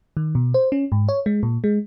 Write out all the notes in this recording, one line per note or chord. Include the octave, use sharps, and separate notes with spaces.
D#3
B2
C5
C#4
G#2
C#5
G#3
A#2
G#3